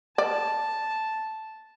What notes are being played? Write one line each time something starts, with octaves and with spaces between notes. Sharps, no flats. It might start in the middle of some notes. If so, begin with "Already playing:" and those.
D5 A5